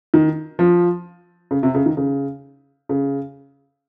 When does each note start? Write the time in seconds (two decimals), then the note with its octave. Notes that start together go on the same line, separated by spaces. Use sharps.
0.14 D#3
0.59 F3
1.51 C#3
1.63 C3
1.75 C#3
1.86 D#3
1.97 C#3
2.89 C#3